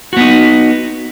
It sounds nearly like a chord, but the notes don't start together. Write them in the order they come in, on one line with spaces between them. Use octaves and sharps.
F#4 B3 D#4